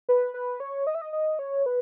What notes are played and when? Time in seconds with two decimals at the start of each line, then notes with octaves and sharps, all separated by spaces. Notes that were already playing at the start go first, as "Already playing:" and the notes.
0.09 B4
0.34 B4
0.60 C#5
0.87 D#5
0.95 E5
1.02 D#5
1.13 D#5
1.39 C#5
1.66 B4